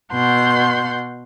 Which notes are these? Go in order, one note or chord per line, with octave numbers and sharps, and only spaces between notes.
B2 F#5 C6 G6